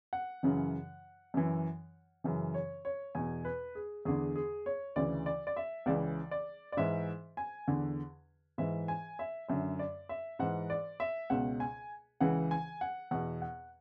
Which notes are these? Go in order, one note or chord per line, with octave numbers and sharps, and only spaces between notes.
F#5
F#2 C#3 E3
F#2 E3
F#2 C#3 E3
C#5
C#5
E2 B2 G#5
B4
G#4
E2 D3 G#4
G#4
C#5
D2 C#3 E3 D5
D5
D5
E5
C#2 C#3 E3 D5
D5
D5
G#2 E3 E5
G#5
E2 D3
G#2 E3 E5
G#5
E5
F#2 D3 E5
D5
E5
G#2 E3 F#5
D5
E5
C#2 B2 F#5
G#5
C#2 C#3 E3 F#5
G#5
F#5
E2 B2 F#5
F#5